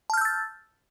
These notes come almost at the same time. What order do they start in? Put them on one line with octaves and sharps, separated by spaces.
A5 F6 G6 E6 A6